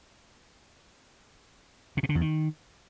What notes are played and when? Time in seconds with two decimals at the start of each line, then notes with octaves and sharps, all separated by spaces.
1.97 C3
2.03 B2
2.09 D3
2.15 E2
2.21 D#3